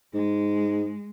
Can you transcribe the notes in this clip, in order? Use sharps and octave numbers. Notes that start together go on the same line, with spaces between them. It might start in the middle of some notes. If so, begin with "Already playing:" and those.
G#2 G#3